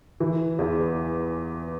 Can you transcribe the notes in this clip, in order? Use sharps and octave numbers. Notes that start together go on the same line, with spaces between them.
E3
E2